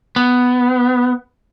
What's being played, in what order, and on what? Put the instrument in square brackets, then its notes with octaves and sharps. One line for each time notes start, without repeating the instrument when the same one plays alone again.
[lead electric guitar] B3